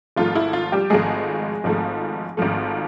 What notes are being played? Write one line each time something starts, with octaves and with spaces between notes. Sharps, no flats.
G#1 G#2 F3 A3 F4
E4
F4
G3 G4
G#1 G#2 F3 G#3 A3 G#4
G#1 G#2 F3 A3
G#1 G#2 F3 A3